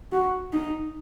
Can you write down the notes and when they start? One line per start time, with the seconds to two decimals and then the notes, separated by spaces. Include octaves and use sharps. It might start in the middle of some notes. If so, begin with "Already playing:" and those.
0.12 F#4
0.53 D#4